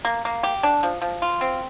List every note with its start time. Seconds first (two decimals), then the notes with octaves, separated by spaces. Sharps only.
0.05 A#3
0.25 A#3
0.43 G4
0.63 D4
0.83 F3
1.02 F3
1.22 F4
1.41 C4